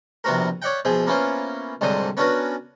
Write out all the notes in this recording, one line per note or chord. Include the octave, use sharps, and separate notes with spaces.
A#1 C3 B3 C4 F#4 A#4
C#5 D5 E5 F#5 G5
B2 F3 G#4 C5 E5
A#3 B3 C#4 E4 F4 C5
C2 G#2 D3 F#3 C5 D#6
B3 C#4 D4 F#4 A#4 B4